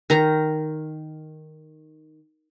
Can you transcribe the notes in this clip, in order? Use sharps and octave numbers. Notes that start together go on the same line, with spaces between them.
D#3 A#5